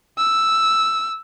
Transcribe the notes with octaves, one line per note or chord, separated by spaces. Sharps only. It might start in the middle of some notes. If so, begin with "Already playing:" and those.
E6